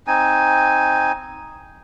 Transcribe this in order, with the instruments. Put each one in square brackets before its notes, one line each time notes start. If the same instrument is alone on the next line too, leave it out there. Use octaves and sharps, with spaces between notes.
[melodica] C4 D#4 G#5